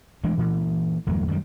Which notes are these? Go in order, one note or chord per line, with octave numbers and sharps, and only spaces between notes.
E3 G#3 A3 D4
A#2 E3
G1 E2 F#3 A3
F#2 D#3 F3 G3